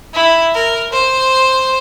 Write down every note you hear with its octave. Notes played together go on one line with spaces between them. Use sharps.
E4
A#4
C5